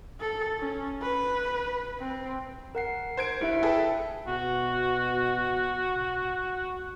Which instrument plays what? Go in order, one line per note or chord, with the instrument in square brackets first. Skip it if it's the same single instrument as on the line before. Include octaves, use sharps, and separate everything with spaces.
[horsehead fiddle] A4
C#4
B4
C4
[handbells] A#4 F#5 C7
[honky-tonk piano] C5 G#6 D7
[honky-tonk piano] G2 [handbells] E4 E5
[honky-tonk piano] G#4 A4 B4 [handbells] G5
[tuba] B2 [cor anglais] F#4